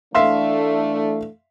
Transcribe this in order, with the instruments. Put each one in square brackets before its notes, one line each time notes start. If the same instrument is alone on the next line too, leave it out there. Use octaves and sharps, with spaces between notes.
[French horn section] E3 A3 D4 [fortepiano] E5 F5 C6